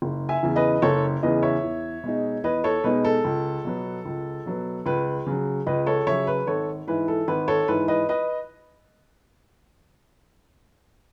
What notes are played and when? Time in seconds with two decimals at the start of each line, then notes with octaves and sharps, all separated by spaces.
0.02 F#1
0.29 E5 G#5
0.42 E2 C#3 E3
0.56 B4 D#5
0.82 F#1 A4 C#5
1.23 E2 C#3 E3 B4 D#5
1.43 C#5 E5
1.63 E2
2.04 B2 G#3 D#4
2.44 E2 B4 D#5
2.64 A4 C#5
2.84 B2 G#3 D#4 B4
3.05 A4
3.25 C#2
3.65 B2 F#3 B3
4.05 C#2
4.46 B2 F#3 B3
4.86 C#2 B4
5.27 C#3 F#3
5.66 C#2 B4 D#5
5.87 A4 C#5
6.07 C#3 F#3 C#5 E5
6.27 B4
6.47 G#1 A4 C#5
6.87 G#2 E3 B4
7.08 A4
7.28 G#1 B4
7.48 A4 C#5
7.68 G#2 E3 B4
7.88 B4 D#5
8.09 B4 D#5